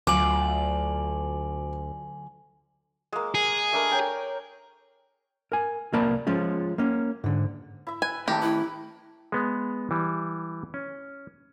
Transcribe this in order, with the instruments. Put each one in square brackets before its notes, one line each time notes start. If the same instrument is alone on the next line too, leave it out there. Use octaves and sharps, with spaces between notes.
[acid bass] D2 [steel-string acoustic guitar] D3 F#3 F4 [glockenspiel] G#5 F#7 [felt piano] D6
[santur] G#3 A#3
[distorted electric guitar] G#4
[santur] A3 D4 A#4
C#5 G5 A#5
[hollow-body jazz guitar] A#4 G#5
C2 A#3 A#4 B4 D5 A5
F3 G#3 C#4 F4
A#3 C#4
G#2 D3
[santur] E4 E5
[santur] B4 [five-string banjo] G#5
[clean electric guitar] A2 D#3 A5 [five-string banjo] G4 [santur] G5 A#5
[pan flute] E4 [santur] B4
[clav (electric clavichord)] G#3 B3
E3 G3
C#4